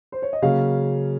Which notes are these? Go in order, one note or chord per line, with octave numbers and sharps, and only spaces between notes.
C5
C#5
D#5
C#3 F#3 A#3 C#4 F5